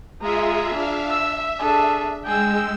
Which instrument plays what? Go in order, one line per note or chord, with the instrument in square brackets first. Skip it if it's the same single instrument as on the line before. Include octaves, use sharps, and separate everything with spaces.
[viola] G#3 [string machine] F4 G#4 E5 [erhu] A#5
[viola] D4 [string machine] E5 F5
[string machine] E5 [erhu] E6
[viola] D4 G#4 [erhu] A4
[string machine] G#3 E6 [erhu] G#4 [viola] G5